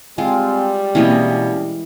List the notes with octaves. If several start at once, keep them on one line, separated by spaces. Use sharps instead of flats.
G3 G#3 C4 F4 G#5
B2 E3 G#3 A#3 C4 C#4 D#5